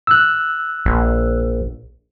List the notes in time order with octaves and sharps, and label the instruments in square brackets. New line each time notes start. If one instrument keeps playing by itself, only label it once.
[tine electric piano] E6 F#6
[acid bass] A#1